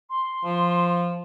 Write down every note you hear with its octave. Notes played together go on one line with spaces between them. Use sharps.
C6
F3